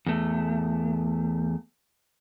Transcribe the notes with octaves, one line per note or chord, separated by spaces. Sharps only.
E2 A3